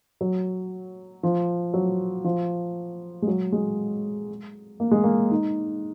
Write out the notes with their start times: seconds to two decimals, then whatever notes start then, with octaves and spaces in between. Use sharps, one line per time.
0.21 F#3
1.23 F3
1.74 F#3
2.24 F3
3.22 G#3
3.28 F#3
3.52 G#3
4.80 A#3
4.91 G#3
5.04 A#3
5.31 D#4